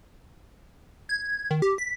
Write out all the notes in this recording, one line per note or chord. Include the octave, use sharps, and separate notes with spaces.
G#6
D#3
G4
B6